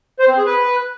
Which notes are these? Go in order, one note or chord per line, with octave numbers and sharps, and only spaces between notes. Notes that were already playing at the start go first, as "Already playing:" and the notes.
C5
C4
G#4
B4